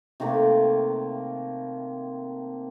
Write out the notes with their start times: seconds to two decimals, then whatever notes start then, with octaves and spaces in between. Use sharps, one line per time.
0.20 C3 D#3 A3 A#3